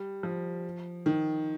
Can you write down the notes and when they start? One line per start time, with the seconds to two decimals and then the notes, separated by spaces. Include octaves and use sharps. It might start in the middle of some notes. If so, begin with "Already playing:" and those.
Already playing: G3
0.23 F3
1.06 D#3